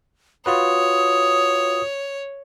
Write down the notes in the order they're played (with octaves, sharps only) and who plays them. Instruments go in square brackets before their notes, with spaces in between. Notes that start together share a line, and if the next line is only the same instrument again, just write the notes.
[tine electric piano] F4 F#4 B4 [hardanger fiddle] C#5 [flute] D#6